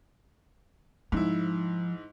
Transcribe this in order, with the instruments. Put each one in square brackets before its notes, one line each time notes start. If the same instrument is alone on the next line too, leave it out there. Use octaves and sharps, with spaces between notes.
[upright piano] G#2 E4 [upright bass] F3